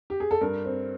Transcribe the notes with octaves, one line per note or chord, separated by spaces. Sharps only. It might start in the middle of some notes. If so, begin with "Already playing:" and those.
G4
G#4
A4
G2 A#4
C4